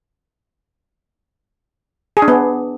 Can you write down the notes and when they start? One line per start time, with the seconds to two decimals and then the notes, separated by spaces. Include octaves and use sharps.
2.17 G#4
2.22 D4
2.28 B3